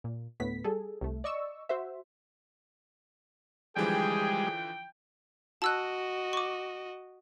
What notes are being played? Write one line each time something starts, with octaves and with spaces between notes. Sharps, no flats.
A#2
D2 A2 B3 B6
G3 G#4 A4
C2 A3
D5 D#5 C#6 E6
F#4 C5 E5
D3 E3 F3 G3 G#3 G#4 G5
F#4 D#5 A5 E6 F#6
C#6 D6